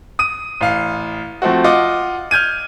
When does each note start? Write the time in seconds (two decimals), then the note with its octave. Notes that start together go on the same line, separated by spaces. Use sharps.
0.19 D#6 D#7
0.61 A1 F5
1.42 F3 A3 C4 F#4
1.64 F4 D#5 F#5 D6
2.31 F6 G6 G#6 D#7